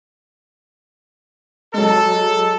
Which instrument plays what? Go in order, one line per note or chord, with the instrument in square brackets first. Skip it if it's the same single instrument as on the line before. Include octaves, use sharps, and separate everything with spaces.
[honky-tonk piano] F#3 G#3 [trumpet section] A4